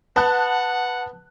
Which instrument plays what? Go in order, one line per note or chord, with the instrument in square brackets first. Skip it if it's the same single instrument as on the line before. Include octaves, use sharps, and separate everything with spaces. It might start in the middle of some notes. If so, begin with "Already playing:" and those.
[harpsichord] B3 [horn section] F#5 [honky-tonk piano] A5 F#6